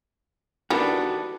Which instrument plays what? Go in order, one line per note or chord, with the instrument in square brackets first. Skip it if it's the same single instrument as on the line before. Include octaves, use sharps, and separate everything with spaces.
[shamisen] D#3 E3 G3 [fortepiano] B3 D4 B4 [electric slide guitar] F#4 A4